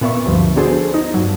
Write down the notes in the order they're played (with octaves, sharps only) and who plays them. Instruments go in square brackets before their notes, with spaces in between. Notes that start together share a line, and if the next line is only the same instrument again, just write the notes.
[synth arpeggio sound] A#2 B3 E5 C#6
D2 G2 F3
B3 D4 F#4 G#4 A4 C5
D#4
G2 F#3